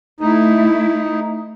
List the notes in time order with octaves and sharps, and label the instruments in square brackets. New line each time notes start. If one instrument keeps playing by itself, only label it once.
[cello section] A3 E4 [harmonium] D#4